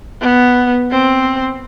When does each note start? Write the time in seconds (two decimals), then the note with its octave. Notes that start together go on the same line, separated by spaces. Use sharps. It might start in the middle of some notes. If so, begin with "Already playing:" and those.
0.21 B3
0.91 C4